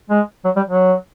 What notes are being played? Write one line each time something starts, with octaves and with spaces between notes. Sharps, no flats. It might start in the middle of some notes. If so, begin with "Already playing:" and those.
G#3
F#3
G3
F#3